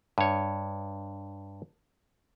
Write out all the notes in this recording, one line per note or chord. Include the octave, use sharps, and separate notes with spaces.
G2 C#5